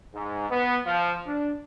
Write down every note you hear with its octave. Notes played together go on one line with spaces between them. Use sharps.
G#2
B3
F3
D4